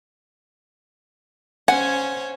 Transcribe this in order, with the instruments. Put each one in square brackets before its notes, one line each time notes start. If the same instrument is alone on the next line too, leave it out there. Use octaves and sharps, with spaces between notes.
[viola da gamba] C#4 C5 C#5 [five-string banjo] F#5 [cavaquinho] G#5